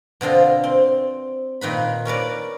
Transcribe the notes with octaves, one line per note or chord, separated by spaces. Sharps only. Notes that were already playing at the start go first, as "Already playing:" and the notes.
B2 D3 C4 F4
C4
A#2 D#3 B4 B5
C#4 A#4 B4 D5